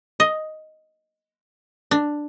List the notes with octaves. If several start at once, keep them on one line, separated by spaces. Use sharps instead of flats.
D#5
D4